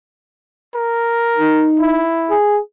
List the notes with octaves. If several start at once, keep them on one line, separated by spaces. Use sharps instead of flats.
A#4
D#4
E4
G#4